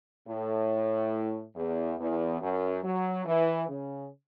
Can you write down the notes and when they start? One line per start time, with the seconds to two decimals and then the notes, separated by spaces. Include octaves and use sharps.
0.28 A2
1.56 E2
1.99 E2
2.40 F#2
2.83 F#3
3.26 E3
3.68 C#3